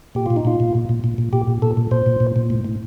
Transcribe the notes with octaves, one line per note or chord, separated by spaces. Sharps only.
A#2 G4
A#2 F4
D#4
A#2 F4
A#2
A#2
A#2
A#2
A#2
A#2 G4
A#2
A#2 A4
A#2
A#2 C5
A#2
A#2
A#2
A2
A2